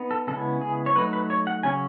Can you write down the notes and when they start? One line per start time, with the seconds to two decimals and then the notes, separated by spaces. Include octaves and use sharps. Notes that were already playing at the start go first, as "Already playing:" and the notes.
Already playing: B3 D#4
0.11 A4
0.27 C#3 G#3 B3 E4 A4
0.61 G#4
0.86 C#5
0.96 F#3 A3 D#4 B4
1.13 B4
1.30 C#5
1.47 F#5
1.63 C#3 F#3 C#4 G#5